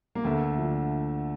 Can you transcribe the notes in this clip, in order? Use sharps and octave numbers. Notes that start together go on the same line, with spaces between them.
A#3
D2 A3
D3 F3